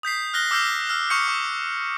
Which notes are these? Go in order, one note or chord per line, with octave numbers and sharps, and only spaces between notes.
D#6 G6 B6 C7
F6 F#6 A#6 G7
D6 E6 F6 G6 C7 G7
E6 F6
C#6 D#6 F6 G6 C#7
D6